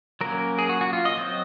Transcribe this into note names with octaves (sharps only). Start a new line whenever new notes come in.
F#3 A#3 C#4 A#4
G#4
F#4
F#4
F4
D#5
F#3 C4